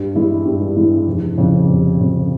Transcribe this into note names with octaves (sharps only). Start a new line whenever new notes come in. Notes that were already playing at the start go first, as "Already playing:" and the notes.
Already playing: G2
E3 G#3 E4
G2
E3 G#3 E4
F1
F2 C#3
F1
F2 C#3